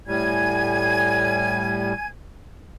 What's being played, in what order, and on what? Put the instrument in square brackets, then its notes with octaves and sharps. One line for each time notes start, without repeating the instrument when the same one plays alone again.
[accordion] A2 G3 [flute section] G#5 G#6